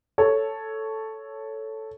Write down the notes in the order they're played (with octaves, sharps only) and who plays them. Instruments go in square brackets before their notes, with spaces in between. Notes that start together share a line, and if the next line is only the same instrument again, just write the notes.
[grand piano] A4 C#5